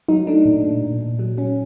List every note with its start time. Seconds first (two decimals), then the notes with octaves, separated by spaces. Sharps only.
0.08 F#3 D#4
0.27 A3 D4
0.45 A#2
0.64 A#2
0.82 A#2
1.01 A#2
1.19 F#3
1.37 F#3 C#4